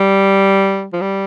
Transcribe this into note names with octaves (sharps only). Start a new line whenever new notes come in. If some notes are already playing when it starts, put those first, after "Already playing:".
Already playing: G3
F3
G3